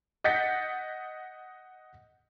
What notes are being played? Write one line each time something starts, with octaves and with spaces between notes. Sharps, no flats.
D#5 F#5 G6 A6 B6 C#7